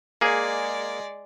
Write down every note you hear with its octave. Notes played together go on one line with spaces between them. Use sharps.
G#3 A#3 G#4 D5